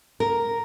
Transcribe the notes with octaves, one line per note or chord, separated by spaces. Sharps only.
A#4